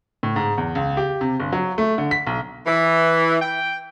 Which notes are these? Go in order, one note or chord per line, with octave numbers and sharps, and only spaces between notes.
A2
G#2
E2
C#2
G4
C3
G1
F#3
A3
D3
B6
B1
E3
G5